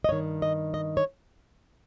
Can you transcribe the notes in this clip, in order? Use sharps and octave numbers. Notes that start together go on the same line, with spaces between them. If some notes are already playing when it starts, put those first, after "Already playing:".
D#5
G2 D#3 C#5
D#5
D#5
C#5